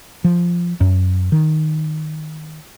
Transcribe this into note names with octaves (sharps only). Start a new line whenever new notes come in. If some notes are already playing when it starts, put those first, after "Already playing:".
F3
F#2
D#3